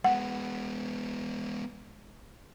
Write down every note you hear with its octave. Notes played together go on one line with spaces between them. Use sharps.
G#3 B3 F#5